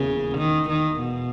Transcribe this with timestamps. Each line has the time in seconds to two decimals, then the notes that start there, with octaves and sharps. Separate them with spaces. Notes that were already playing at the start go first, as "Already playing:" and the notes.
Already playing: E1 D#2 C#3 A#3 E4
0.38 D#3
0.69 D#3
1.00 B2